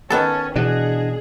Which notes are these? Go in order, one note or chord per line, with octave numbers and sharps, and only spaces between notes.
D#3 B3 C#4 A4 A5
B2 E3 D4 G#4 D#5 F#5